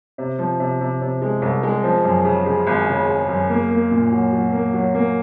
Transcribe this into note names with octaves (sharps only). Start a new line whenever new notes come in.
C3
F3
C3
C3
C3
G#3
C2
G#3
F3
F#2
C#3
C#3
G#1
C#3
C#3
F#2
A#3
A#3
A#2
F#3
F#3
A#3
F#3
A#3